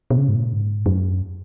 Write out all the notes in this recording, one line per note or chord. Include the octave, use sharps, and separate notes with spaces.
B2
C#3
G#2
A#2
G#2
F#2